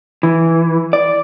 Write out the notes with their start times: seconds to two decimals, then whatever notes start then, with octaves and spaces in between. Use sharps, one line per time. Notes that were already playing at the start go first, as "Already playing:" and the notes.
0.23 E3
0.93 D5